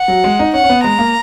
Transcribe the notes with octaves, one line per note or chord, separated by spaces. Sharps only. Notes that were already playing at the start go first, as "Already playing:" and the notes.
Already playing: F#5
F#3
G#3
D#4
C#4 F#5
C#4
B3
G#3 A#5
A#3